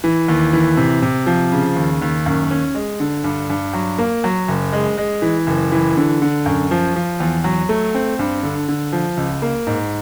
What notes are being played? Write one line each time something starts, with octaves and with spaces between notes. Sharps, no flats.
E3
D#2
E3
C3
C3
F3
C#3
D#2
D#2
F#2
C#4
G#3
D3
G2
G2
F#3
A#3
F#3
F#1
G#3
G#3
E3
F#1
E3
D3
D3
F#2
F3
F3
E2
F#3
A3
C4
G2
D3
D3
F3
C#2
A#3
G#2